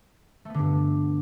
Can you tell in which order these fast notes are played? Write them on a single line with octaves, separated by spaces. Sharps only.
A3 B3 D3 G2